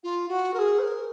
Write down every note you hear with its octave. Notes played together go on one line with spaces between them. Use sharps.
F4
F#4
A#4
G#4
C5
A#4